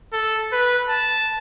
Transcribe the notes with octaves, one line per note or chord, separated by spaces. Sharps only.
A4
B4
A5